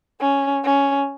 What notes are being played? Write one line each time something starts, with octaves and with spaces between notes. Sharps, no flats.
C#4
C#4